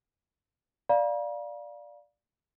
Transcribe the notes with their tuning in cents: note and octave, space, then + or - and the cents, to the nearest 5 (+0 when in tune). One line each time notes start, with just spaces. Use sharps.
D5 +0 F5 +10 A#5 +45